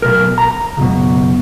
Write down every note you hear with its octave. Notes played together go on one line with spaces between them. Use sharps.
B1 A#4
A#5
C#2 F#2 B2